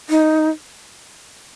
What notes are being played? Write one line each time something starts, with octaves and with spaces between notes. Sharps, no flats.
D#4